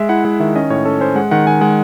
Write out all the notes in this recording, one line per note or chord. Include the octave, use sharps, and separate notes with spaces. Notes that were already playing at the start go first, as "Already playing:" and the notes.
Already playing: G#3 E5
E4 F#5
G#3 F#5
D#3 E5
C#4 D#5
A2 C#5
C#4 A4
C#4 C5
G#3 F#5
D#3 F#5
D#3 G#5
G#3 F#5